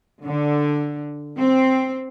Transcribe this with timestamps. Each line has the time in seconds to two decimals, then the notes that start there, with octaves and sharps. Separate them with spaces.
0.24 D3
1.39 C4